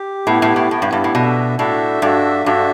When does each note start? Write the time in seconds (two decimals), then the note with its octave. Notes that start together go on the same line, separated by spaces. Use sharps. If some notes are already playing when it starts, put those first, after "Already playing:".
Already playing: G4
0.27 A2 B3 E4 G4
0.42 A2
0.56 A2
0.71 A2 B3 E4 G4
0.82 G2
0.93 G2
1.04 A2
1.14 B2 D4 F#4 A4 E5
1.58 A2 D4 F#4 A4 E5
2.02 G2 D4 F#4 A4 E5
2.46 G2 D4 F#4 A4 E5